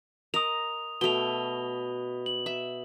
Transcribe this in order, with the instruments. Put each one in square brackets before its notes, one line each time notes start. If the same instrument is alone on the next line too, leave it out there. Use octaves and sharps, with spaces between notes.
[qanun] A#4 D#5 [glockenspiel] D#6 F7
[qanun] B2 A3 [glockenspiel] F7 G7
[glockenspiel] F#7
[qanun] E5